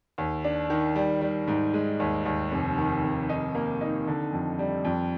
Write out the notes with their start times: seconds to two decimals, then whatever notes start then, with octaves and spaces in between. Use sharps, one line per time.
0.18 D#2
0.44 D4
0.70 D#3
0.95 G3
1.21 G3
1.47 G#2
1.74 G#3
2.00 D#2
2.26 D#2
2.51 F1
2.78 D#3
3.03 F1
3.29 D#4
3.55 A#3
3.81 D#4
4.07 D3
4.33 F2
4.59 G3
4.85 F2